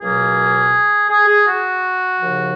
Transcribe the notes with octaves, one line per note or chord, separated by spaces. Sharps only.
C#2 B2 F#3 A#3 G#4
G#4
G#4
F#4
D#2 C#3 F3